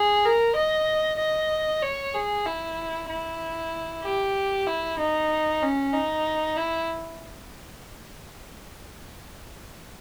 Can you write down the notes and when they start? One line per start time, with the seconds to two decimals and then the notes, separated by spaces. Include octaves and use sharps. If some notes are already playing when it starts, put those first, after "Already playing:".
Already playing: G#4
0.25 A#4
0.56 D#5
1.19 D#5
1.83 C#5
2.15 G#4
2.46 E4
3.09 E4
4.04 G4
4.67 E4
4.99 D#4
5.62 C#4
5.93 D#4
6.57 E4